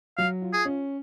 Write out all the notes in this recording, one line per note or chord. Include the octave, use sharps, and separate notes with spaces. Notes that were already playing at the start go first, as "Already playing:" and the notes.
F#3 F5
F4
G#4
C#4